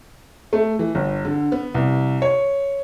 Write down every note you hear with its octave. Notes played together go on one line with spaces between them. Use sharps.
A3
E3
G1
D3
B3
C2
C#5